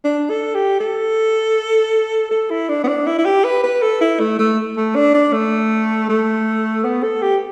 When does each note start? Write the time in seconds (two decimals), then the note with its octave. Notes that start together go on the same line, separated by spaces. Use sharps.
0.05 D4
0.30 A4
0.55 G4
0.80 A4
2.31 A4
2.50 E4
2.69 D4
2.84 B3
2.88 D4
3.07 E4
3.18 E4
3.25 G4
3.44 B4
3.64 B4
3.82 A4
4.01 E4
4.20 A3
4.39 A3
4.77 A3
4.96 D4
5.14 D4
5.33 A3
6.09 A3
6.85 B3
7.03 A4
7.22 G4